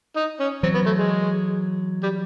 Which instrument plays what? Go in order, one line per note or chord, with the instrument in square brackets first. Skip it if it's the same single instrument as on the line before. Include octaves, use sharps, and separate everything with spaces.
[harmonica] D#4
C#4
[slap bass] E3 F#3 [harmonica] C4
[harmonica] B3
A3
G#3
G3